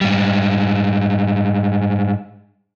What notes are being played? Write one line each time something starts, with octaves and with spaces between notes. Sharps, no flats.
G#2 G3